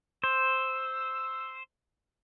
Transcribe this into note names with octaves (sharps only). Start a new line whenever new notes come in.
C5 E6